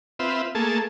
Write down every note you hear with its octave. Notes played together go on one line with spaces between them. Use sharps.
C4 F4 B4 E5
A3 A#3 G#4 A5